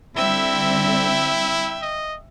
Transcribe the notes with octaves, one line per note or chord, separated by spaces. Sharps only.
D3 G3 C4 E4 E5 G5
D#5